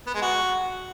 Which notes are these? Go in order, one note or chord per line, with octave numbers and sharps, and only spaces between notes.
B3
G#3
F#4